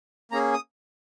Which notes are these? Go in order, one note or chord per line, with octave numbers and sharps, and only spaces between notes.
A#3 C#4 G#4 A#5
D#6